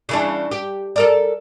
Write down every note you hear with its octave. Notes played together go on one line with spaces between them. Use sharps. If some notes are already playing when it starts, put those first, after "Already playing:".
C#3 E3 D4
G4
A4 A#4 D5